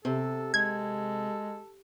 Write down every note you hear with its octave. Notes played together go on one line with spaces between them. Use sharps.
C3 A4
G#3 A4 G#6